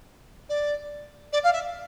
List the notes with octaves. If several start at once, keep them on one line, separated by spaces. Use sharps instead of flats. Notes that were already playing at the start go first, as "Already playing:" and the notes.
D5
D5
F5
E5